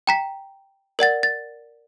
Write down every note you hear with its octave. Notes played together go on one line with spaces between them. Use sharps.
G5 A#5 B6
A#4 D5 F#5 A6
A6